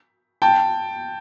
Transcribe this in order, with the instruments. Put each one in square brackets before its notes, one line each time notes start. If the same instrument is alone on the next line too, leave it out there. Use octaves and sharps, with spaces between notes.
[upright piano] G5 A5